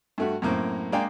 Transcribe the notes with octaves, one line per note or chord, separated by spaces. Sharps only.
G2 A3 F#4
F#2 A2 A#3 C4
G#3 A#3 D4 F5 G5 G#5